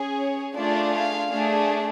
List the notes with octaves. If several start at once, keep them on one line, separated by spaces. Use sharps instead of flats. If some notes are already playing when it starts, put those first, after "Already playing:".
Already playing: C#4 G#4
C#5
A3 D4 F4 G#4 D5
F5
A3 D4 G#4